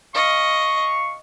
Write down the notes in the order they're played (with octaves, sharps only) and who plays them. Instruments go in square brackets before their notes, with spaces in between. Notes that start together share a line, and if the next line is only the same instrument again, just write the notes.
[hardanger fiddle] D#5 [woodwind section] F5 C#6